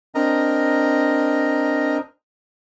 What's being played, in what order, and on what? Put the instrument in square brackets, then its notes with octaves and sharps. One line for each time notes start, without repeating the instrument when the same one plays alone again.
[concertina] C4 D4 A#4 D#5 A#5